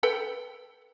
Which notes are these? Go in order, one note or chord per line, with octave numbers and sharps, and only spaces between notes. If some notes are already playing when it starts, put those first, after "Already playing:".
A4 B4 G5